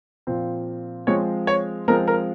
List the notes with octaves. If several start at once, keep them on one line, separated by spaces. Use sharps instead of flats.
A#2 F3 C4
F3 G#3 C4 C#5
C#5
F3 G#3 C4 A#4
A#4